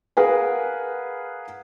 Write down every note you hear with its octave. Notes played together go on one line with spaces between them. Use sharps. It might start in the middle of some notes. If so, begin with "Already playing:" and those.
G#4 A#4 B4 F5 F#5 G#5